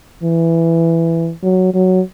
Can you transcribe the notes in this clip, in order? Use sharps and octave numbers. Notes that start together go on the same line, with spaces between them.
E3
F#3
F#3